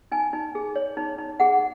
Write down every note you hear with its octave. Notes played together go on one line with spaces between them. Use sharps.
D#4 G#5
D#4
G#4
C#5
D#4
D#4
G#4 F#5